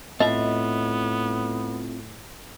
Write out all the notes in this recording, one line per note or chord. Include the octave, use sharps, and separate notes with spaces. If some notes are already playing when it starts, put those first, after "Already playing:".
A2 B3 C4 F4 D#5 E5